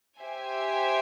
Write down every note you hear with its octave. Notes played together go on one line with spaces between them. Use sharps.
G4 C5 E5 G#5